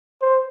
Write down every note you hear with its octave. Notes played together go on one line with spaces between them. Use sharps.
C5